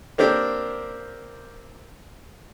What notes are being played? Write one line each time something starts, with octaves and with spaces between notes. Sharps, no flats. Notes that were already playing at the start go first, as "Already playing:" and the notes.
A#3 C4 D4 G4 A#4